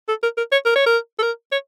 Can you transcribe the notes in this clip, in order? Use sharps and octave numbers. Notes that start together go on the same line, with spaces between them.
A4
A#4
A#4
C#5
A#4
C#5
A#4
A4
A#4
C#5